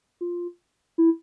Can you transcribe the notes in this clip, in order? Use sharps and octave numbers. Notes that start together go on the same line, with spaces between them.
F4
E4